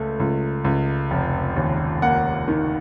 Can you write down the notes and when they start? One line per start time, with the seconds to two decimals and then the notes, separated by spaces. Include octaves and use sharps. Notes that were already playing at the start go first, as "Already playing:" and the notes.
Already playing: C#2 A3
0.20 C#2
0.64 C#2
1.11 F1
1.56 D#2
2.02 A#3 F#5
2.48 D#3